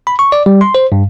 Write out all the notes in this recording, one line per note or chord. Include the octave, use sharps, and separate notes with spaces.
B5
C#6
D5
G3
C6
C5
G2